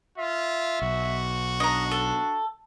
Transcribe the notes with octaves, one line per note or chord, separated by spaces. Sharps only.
F4 E5
B1 F#4
D4 D#5 A#5
A4